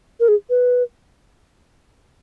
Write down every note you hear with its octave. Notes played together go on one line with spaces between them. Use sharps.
A#4
G#4
B4